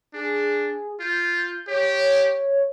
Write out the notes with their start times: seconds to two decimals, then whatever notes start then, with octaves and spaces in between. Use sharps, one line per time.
0.14 D4 G#4
1.00 F4 G6
1.67 G4 C#5